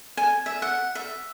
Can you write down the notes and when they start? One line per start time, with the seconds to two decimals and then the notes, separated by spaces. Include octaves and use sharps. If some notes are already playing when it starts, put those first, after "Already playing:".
0.17 G#5
0.46 E5
0.62 F#5
0.95 E5